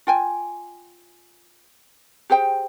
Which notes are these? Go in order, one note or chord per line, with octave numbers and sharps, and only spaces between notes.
F4 G5 G#5
G4 G#4 C5 G5